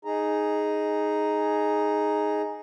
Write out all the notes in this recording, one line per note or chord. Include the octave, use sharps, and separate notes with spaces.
D#4 G#4 A#5